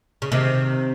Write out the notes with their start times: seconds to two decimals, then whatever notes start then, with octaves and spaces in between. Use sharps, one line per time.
0.22 C#3
0.32 C3 D#3